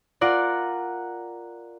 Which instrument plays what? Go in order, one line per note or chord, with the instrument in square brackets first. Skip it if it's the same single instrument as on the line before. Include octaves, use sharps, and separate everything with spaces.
[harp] F4 A#4 D5 F#5